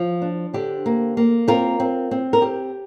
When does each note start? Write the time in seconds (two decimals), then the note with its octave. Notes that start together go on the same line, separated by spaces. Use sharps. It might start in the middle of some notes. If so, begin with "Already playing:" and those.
Already playing: F3 F4
0.22 D4
0.54 D3 G4 C5
0.86 A#3
1.17 A#3
1.48 C4 F4 A#4
1.80 C4
2.11 C4
2.33 A#4
2.42 C4 G4